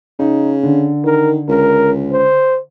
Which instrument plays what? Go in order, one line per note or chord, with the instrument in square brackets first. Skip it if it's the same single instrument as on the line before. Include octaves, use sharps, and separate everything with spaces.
[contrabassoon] C#3 [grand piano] D#4
[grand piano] D3
[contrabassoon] D#3 [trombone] A#4
[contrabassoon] C#2 [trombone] A#4
[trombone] C5